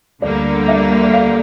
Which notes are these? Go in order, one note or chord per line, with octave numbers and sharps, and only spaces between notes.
D2 D3 G3 A#3 D5
E5
F5